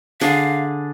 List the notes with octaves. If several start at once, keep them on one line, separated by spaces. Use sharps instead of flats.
D3 D4 G#4 F5